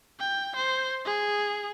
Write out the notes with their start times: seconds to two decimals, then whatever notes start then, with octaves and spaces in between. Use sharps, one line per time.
0.19 G5
0.56 C5
1.06 G#4